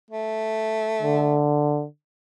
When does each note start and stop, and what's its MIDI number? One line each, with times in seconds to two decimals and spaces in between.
0.10 1.48 57
1.02 1.85 50